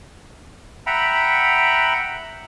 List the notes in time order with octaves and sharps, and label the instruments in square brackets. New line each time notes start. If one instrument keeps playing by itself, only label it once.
[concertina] E5 F#5 G5 A#5 B5